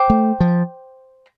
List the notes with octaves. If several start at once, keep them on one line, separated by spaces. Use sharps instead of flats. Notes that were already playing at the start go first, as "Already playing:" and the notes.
Already playing: C5 G5 D6
A3
F3